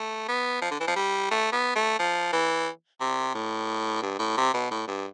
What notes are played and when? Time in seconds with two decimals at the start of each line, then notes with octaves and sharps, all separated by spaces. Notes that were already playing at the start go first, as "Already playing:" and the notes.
Already playing: A3
0.29 B3
0.62 F3
0.71 D3
0.80 E3
0.88 F3
0.96 G3
1.31 A3
1.52 B3
1.76 A3
1.99 F3
2.33 E3
3.01 C3
3.35 A2
4.02 G2
4.19 A2
4.37 C3
4.54 B2
4.71 A2
4.88 G2